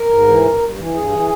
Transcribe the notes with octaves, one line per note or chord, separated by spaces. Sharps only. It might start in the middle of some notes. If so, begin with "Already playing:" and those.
Already playing: A#4
G#2
E3
G2
G2
E3
G2 G#4
E3